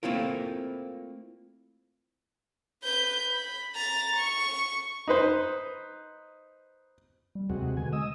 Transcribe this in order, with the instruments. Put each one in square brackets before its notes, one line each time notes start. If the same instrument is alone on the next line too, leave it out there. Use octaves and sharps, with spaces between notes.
[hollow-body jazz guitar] A3 A#3 C4 E4 F4 A#4
[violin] B4 G6
B5
A#5 A6
C#6
[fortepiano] D#4 B4 C5
[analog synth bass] G3
[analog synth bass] D#2 [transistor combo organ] C3 G#3 F#4
[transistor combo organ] B2 G#5 [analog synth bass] D3
[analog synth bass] G#3 [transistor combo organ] D#5 D#6 E6